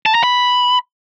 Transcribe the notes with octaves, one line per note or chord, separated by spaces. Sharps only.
A5
A#5
B5